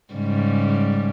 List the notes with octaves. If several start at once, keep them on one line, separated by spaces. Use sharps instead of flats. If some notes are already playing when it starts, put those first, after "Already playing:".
G#2 C#3 G3